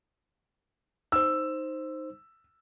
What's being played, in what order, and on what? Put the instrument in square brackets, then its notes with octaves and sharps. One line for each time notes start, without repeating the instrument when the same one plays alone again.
[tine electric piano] D#4 C5 [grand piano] E6